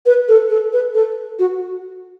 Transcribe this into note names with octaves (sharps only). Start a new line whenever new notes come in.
B4
A4
A4
B4
A4
F#4